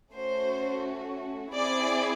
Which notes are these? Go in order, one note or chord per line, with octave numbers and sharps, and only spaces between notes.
A3 C#4 F#4 C5
C4 E4 G#4 D5